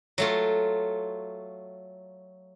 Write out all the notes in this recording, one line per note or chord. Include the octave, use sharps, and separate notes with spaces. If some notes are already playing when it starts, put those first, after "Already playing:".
F#3 A3 F4